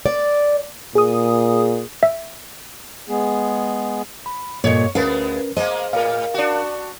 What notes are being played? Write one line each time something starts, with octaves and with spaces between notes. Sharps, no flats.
D5
A#2 G#4 D#6
E5
G#3 B3 G#4
B5
G2 A#2 A#3 A4 C#5 D#5
D2 G#3 B3 C#4 A#4 B4 F5
G#3 A#3 C5 D#5
A2 A#4 F5
D4 F#4